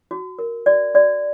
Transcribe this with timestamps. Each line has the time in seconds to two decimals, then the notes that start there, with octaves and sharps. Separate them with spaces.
0.11 F#4
0.39 A#4
0.66 F#4 D5
0.95 F#4 D5